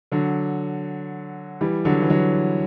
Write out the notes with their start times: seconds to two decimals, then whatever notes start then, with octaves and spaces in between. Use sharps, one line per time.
0.12 D3 F#3
1.61 E3 G3
1.85 D3 F#3
2.02 E3
2.10 D3 F#3